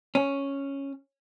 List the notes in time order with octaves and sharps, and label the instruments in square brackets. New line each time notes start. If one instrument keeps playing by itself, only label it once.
[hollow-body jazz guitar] C#4